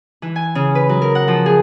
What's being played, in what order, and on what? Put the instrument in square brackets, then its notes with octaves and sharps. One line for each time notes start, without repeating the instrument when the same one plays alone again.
[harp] E3
G#5
C#3
B4
F#3
A#4
F#5
F3
G#4